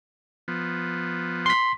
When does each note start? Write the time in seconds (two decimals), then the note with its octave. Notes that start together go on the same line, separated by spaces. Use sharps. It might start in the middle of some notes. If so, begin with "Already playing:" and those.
0.48 F3 B3
1.46 C6 B6